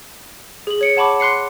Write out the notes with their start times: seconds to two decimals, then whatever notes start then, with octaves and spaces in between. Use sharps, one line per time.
0.67 G#4 F#7
0.81 C#5 C#7 D7
0.96 C#5 F#5 A5 B5 C#6 D6
1.20 C6 F#6 C7 C#7